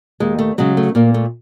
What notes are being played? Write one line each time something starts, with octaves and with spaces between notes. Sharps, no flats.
D#2 G#3
A3
C#3 F#3 G#3
A3
A#2 A#3
A3